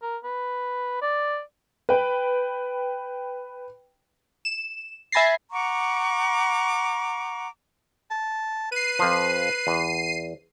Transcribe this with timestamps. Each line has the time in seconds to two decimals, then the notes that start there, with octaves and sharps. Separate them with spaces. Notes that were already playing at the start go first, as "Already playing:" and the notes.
0.02 A#4
0.24 B4
1.02 D5
1.89 B4 G5
4.45 E7
5.12 E5 G#5 B5 A6 A#6 C7
5.52 F#5 A#5 C#6 D6
8.11 A5
8.72 B4 C7 D#7
8.99 F2 F3
9.67 E2